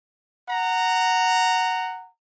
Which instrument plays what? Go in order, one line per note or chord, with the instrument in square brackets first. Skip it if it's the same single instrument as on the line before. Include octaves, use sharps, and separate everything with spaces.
[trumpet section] F#5 A#5